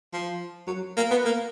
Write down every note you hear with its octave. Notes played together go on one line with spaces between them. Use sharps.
F3
F#3
A#3
B3
A#3